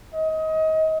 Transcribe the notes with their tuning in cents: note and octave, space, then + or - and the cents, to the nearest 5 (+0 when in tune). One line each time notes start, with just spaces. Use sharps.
D#5 +25